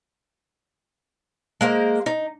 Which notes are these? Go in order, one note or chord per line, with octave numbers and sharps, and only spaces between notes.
G#3 A#3 C5
D#4